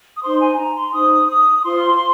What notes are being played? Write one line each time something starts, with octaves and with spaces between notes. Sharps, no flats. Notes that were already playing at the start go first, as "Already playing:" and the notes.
D#6
D#4 C5 C6
G#5
A#5
C6
D#4 C5 D#6
D#6
D#6
F4 C5 C6